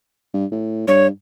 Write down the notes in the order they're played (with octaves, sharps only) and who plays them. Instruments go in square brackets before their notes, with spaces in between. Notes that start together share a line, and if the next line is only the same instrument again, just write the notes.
[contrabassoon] G2
A2
[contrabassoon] G2 [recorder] C#5